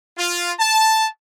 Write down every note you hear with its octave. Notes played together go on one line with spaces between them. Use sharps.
F4
A5